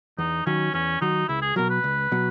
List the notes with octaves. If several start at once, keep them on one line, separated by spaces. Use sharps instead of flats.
E2 D#4
D#3 F#3 C#4
E2 C#4
D#3 F#3 D#4
C#2 E4
G#4
B2 F#3 A#4
B4
C#2
B2 F#3